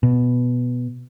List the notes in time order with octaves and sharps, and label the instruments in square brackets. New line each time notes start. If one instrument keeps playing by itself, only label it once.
[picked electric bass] B2